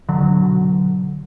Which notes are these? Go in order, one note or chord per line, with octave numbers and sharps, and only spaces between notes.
B1 D3 F#3
B2